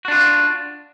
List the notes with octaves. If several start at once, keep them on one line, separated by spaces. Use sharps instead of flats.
D4 F4 F#4